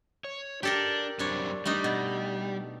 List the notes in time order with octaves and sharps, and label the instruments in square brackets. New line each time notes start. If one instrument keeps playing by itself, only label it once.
[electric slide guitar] C#5
[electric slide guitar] D4 [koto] G4 A4 A#4
[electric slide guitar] F#2 G3 C4 [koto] D4 C#5
[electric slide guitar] G3 [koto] A3 D4 D#4
[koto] B2